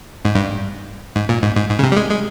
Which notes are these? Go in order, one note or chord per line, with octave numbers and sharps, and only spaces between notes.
G#2
G2
G#2
A#2
G#2
G#2
G#2
C#3
C3
G3
G#3
G#3